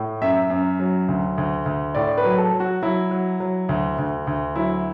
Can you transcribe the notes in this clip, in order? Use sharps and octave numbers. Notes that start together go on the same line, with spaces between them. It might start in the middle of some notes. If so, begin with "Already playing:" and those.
Already playing: A2
F#2 E5
F#2
F#3
D2
D2
D2
A2 D5
B4
F#3
A4
F#3
F#4
F#3 E4
F#3
F#3
D2
D2
D2
F#3 E4